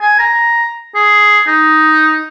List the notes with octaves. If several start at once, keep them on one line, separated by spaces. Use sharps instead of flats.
G#5
A#5
G#4
D#4